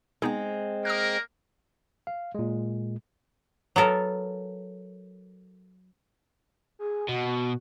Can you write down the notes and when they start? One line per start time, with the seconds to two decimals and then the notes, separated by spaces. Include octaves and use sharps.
0.22 G#3 B3 C4 D#4 G#4
0.85 A#3 A#4 D#6 F#6
2.07 F5
2.35 A#2 G#3
3.76 F#3 B3 A4 A#4
6.79 G#4
7.08 B2 F#4